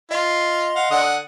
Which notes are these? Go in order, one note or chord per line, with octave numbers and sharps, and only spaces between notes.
F4 D#5 C6
F5 F#5
D3 F#5 D#6